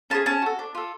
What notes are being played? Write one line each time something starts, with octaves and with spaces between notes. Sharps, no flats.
C#4 F4 G#4 A5
C#4 A5
F#4 A4
D4
F4 A4